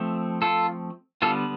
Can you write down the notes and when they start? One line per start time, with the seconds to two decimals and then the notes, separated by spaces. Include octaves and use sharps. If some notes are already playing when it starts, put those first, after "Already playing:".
Already playing: F3 A3 C4
0.42 F4 A4
1.22 D3 G3 B3 F4 A4